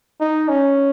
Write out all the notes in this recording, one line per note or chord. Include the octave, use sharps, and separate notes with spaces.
D#4
C#4